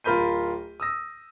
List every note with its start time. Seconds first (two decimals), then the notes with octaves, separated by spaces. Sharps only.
0.04 D1 F4 A#4 B5 G6 D#7
0.80 D#6 E6 A#6